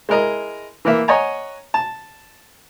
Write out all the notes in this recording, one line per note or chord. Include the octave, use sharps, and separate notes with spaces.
G#3 E4 A#4 D#5
E3 A#3 A#4 E5
C#5 D#5 F#5 G#5 A#5
A5